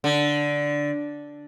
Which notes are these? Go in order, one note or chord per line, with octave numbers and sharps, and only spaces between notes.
D3